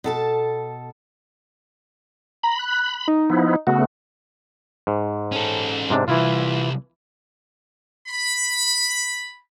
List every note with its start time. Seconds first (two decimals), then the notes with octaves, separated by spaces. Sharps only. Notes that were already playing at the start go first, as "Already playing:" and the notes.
0.04 B2 A4 A5
2.43 A#5 B5
2.59 F#6
3.08 D#4
3.30 F3 B3 E4
3.67 C#3 A3 B3 F#4
4.87 G#2
5.32 C#4 A4
5.90 G#2 C3 D4
6.08 C2 E3 E4 F4
8.07 B5